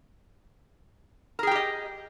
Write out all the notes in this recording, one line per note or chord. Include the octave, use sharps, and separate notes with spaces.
G4 G#4 A#4 D#5 G5